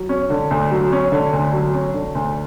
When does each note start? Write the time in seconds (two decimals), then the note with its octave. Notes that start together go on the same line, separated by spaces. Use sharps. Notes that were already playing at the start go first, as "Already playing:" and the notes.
Already playing: F#3
0.09 C#4
0.30 D3
0.51 D2
0.71 F#3
0.92 C#4
1.12 D3
1.32 D2
1.53 F#3
1.74 C#4
1.94 D3
2.15 D2